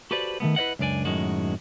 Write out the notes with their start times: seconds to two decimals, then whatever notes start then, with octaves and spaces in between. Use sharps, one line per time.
0.11 F#4 G4 A4 B4 C5 D5
0.40 D#3 F3 A3 B3
0.56 E4 B4 C#5 D#5 F#5
0.79 C#2 F#2 D4 D5 G#5
1.05 F#2 A2 D#3 G#3 F#4